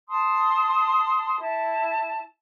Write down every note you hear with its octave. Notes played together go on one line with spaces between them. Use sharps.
A5 C6 D#6
E4 A5